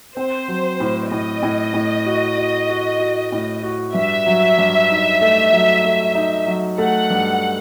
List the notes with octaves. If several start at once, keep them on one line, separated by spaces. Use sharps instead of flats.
C4 C5
F#3
A2
A2 D#5
A2
A2
F#4
F#4
F#4
F#4
A2
F#4
G2 E5
F#3
G2
D#4
A3
F#3
A3
D#4
F#3
A3 F#5
G2